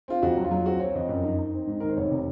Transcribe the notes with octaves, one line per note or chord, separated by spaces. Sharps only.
C4 F4
F2 F#4
F#3
F4
F#3
C4 F#4
C4 C#5
F2 D#5
F#2
D#4
D#4
C4
G#2
D#3 A#4
C5
F1 C#5
C3